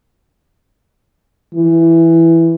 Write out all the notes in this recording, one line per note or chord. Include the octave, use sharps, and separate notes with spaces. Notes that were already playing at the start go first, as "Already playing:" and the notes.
E3